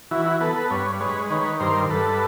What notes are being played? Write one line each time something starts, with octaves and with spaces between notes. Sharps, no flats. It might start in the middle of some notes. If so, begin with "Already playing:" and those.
E3 E4 F#4
E4 F#4
B3 A4 B4
A4 B4
G2 B4 C#5
G#3 B4 C#5
D#3 B4 C#5
G2 A#4 C5
G2 A4 B4